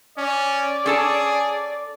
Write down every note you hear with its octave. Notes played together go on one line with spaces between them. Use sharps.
C#4 D5
C#4 G#4 A4 A5